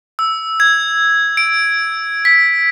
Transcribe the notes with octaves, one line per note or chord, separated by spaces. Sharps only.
E6
G#6
D7
B6